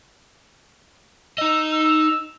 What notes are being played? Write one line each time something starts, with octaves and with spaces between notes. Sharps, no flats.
D#4 D#5 E6
E6